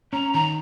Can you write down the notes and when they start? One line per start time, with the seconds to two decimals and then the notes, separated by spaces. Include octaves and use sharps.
0.13 C#4 A#5
0.33 D#3 A#5